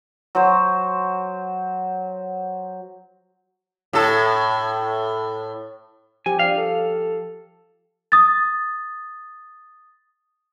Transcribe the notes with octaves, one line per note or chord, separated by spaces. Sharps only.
F#3 C5
A2 A4
F3 C4 G4 G#5
D4 F5
A4
D#6 A6